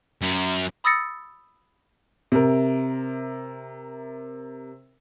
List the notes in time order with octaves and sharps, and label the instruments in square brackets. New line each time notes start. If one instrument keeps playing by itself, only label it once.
[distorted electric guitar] F#2
[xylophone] B5 D#6 E6 A6 A#6 C#7
[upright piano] C3 A#4